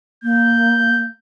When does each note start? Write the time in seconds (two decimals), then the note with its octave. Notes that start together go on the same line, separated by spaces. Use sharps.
0.24 A#3 G6